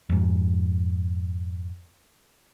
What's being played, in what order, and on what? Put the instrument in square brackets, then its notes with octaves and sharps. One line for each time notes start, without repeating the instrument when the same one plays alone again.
[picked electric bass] F2 G#2